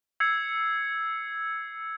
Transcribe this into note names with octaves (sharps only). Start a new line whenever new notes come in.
E6 G#6 C7 C#7